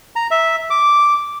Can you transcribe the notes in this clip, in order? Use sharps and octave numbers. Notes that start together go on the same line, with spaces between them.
A#5
E5
D6